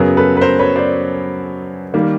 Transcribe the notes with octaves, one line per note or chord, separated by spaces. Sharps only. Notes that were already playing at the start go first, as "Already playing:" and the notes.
Already playing: F#2 C#3 F#3 B3 G#4 A#4
A4 B4
B4
A#4 C5
B4 C#5
C5 D5
D#3 G3 A#3